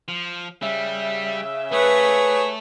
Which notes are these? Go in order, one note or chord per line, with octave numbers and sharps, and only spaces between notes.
F3
C#3 G3 E5
A3 G#4 B4 C#5